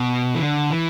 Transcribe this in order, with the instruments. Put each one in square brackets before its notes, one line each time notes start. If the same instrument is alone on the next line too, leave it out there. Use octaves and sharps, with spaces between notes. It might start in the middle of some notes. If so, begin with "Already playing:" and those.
Already playing: [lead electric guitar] B2
E3
D3
E3